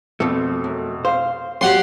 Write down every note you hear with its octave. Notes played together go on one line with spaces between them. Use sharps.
F2 B2 F3 A3
F#2
C5 F5
F#3 G4 D5 F#5 G5 C6